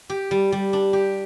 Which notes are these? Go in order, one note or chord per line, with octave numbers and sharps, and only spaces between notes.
G4
G3
G3
D4
G4